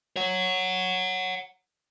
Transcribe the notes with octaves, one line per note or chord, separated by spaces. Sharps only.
C#5 F#5